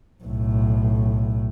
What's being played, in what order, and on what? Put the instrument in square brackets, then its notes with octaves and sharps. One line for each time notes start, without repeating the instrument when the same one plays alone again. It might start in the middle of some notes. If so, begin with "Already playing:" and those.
[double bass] B1 A2